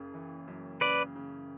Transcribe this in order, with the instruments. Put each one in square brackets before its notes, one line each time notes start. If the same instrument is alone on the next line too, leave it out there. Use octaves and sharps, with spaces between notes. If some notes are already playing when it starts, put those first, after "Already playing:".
Already playing: [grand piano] F#1 C#3
E3
F#2
[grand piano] C#3 [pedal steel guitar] B4 D5
[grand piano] C#3